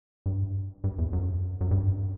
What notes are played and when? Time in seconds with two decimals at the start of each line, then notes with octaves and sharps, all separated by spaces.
0.26 G2
0.84 G2
0.99 E2
1.13 F#2
1.61 F#2
1.71 G2